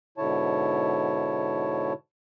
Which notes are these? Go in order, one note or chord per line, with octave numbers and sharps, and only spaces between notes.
G#2 B2 D3 E4 C#5 A5